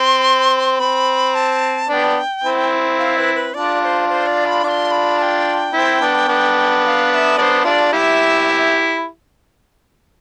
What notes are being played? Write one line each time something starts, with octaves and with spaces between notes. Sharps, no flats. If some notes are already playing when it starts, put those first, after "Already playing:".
Already playing: C4 C6
C4 B5
A5
B3 D4 G5 A5
C4 E4
F5
B4
B4
D4 F4 D5
D5
C5
C5
D5
B5
D4 F4 C6 D6
B5
A5
G5
C4 E4
B3 D4
B3 D4
G5
F5
F5
E5
B3 D4 C5 D5
D4 F4 E5
D5
E4 G4 E5 F5